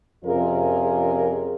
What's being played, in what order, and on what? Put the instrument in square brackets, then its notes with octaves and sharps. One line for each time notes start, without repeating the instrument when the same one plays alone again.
[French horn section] F2 C3 C#4 F4 G#4 A#4